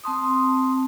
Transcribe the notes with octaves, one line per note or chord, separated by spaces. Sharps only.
C4 A5 C6 D#6